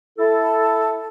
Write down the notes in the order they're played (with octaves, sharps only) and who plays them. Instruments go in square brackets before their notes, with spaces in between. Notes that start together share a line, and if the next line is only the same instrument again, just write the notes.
[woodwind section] E4 A4